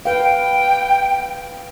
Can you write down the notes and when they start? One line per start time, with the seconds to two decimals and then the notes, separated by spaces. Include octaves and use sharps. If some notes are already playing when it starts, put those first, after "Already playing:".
0.05 B4 F5 G5